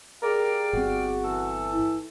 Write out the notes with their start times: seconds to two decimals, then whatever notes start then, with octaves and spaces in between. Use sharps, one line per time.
0.22 G4 G#4 A#4 D5 F5
0.73 G1 C4 F#4
1.23 E3 A4
1.71 E4